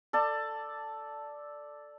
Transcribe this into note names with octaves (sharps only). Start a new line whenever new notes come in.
A4 D5 A5